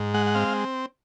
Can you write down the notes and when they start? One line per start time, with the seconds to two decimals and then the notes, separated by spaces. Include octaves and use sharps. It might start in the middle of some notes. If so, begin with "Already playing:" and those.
Already playing: G#2
0.14 G#3 F#5
0.26 F#5
0.34 C4 F5